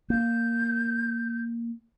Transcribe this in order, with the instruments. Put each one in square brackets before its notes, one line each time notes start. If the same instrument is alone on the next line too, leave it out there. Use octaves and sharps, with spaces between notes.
[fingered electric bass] A#3 [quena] G6